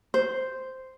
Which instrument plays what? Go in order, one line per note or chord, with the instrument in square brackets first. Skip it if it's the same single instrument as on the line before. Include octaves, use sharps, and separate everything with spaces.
[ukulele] C5